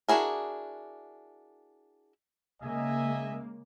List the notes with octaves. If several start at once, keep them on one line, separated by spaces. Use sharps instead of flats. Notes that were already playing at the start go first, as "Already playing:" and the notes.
D4 E4 F#4 G#4 A#4
C#3 G#3 A#3 D#5 E5 G#5